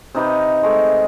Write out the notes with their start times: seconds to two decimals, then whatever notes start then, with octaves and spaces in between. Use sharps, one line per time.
0.15 C3 D#4 B4 D6
0.63 G#3 A3